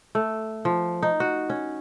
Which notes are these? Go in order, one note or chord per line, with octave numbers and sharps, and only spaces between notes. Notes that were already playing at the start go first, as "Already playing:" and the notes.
A3
F3
D#4
F#4
C#4